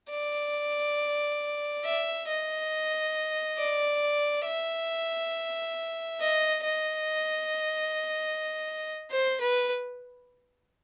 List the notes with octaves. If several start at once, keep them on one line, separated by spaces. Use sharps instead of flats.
D5
E5
D#5
D5
E5
D#5
D#5
C5
B4